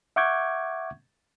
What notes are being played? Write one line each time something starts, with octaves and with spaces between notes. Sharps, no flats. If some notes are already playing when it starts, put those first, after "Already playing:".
E5 F#5 C#6 D6 G6 G#6